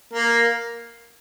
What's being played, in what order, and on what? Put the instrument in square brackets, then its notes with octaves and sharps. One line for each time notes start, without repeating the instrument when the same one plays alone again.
[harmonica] A#3